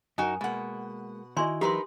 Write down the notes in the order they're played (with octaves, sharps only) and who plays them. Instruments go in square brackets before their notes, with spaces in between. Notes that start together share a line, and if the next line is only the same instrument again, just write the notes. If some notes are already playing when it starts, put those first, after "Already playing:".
[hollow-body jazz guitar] F#2 A#4 [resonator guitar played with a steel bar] D#4 F#4 [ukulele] G#5
[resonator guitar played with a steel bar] B2 F#5 [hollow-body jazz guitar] G#3 A#3
[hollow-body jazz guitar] D#3 [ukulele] E4 F#4 D#5 [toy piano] D5 G#5 C6
[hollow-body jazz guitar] E3 F#3 E5 [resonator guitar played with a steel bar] D#4 A#4 B4 [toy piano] G4 C6